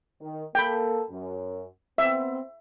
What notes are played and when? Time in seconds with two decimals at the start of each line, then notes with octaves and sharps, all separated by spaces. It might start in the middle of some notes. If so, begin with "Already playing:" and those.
0.21 D#3
0.55 A#3 A4 G5 B5
1.10 F#2
1.98 B3 C4 E5